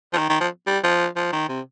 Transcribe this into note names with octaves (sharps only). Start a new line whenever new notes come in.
F3
D#3
D#3
F3
G3
F3
F3
D#3
C3